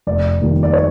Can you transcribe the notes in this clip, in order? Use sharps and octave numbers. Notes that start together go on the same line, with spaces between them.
F1 D5
D#2 D#3 G3
D5
C#5